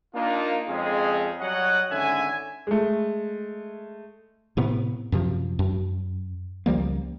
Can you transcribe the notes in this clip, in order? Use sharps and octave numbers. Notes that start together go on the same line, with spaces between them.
A#3 D4 D#4 F4
F2 G#3 C4 C#4 G#4
F#3 G3 C#5 D#5 F#5
G#1 D3 C#4 E5 G#5
G#3 A3
A2 C3 B3
F#2 C3 F3
F#2
C#2 F3 G3 A#3